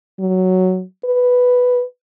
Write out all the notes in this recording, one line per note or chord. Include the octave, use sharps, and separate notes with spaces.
F#3
B4